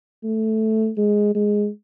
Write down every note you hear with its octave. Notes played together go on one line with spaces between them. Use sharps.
A3
G#3
G#3